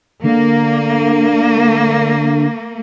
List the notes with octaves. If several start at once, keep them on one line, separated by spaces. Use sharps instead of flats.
D3 A#3